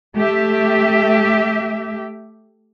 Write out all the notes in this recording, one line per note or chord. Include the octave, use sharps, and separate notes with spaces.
A3 G4 E5